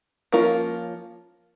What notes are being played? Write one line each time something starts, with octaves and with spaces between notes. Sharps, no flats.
F3 A#3 C#4 F4 A#4